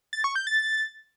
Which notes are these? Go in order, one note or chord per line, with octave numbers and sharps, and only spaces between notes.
A6
C#6
G6
A6